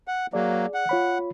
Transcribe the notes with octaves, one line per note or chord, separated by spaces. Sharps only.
F#5
F#3 A#3 G#4 D5
F#5
F4 C#5 B5